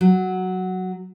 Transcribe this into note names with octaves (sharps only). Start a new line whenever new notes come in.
F#3